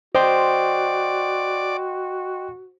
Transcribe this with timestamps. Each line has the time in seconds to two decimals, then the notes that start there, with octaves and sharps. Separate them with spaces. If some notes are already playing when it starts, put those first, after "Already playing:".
0.15 F#4 C5 D5 D#5 G5 C6